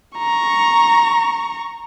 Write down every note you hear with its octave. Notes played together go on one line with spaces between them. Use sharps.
A#5 C#6